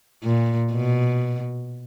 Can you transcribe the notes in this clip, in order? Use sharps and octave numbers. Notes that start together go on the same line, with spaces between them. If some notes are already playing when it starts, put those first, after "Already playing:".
A#2
B2